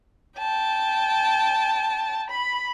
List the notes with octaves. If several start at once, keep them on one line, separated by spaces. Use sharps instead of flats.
G5 A5
B5